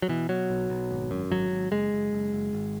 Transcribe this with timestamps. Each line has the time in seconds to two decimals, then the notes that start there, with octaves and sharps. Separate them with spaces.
0.02 F#3
0.08 B2 E3
0.29 B2 F#3
0.50 B1
0.70 B1
0.91 G#1
1.11 F#2
1.31 G#1 F#3
1.51 G#1
1.71 F#1 G#3
1.92 F#1
2.13 F#1
2.32 F#1
2.53 G#1